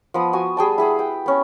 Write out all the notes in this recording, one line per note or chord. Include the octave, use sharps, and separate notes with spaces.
F3 B3 D#6
F#4 G#5
G3 G#4 G5 A5
E4 G#4 F#5
G5
B3 C#4